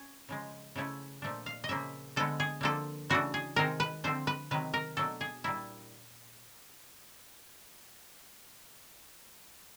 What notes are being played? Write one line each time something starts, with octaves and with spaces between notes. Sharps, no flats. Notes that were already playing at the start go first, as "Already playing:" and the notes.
Already playing: C#4
C#3 F3 G#3
C#3 F3 A3 C#4 E4
A#2 F3 A3 D4
F5
D#5
C#3 F3 A#3 E5
D3 F3 G#3 B3 A4
G#4
D3 F3 A#3 D4 A4
C#3 E3 A3 D4 F#4
G#4
C3 D#3 G#3 C4 D#4 A#4
B4
D3 F3 A3 C4 C5
B4
C3 D#3 F#3 B4
A#4
B2 F#3 A3 D4 A4
G#4
A#2 G3 A#3 D4 E4